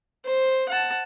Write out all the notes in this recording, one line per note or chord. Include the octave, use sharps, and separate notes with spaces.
C5
F#5 A5